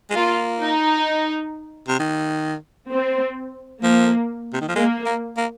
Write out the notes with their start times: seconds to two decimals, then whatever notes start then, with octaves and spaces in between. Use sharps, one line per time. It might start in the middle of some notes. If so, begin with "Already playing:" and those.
0.10 G#3
0.16 A#3 F4
0.61 D#4
1.88 C3
1.99 D#3
2.91 C4
3.83 F3 A#3
4.53 C3
4.61 D#3
4.68 F3
4.76 G#3 A#3
5.06 A#3
5.37 A#3